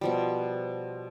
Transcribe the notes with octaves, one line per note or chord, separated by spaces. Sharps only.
B2 F3 G3